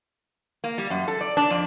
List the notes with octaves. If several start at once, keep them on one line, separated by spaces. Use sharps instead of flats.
A#3
G3
F#2
A4
D5
D4
F2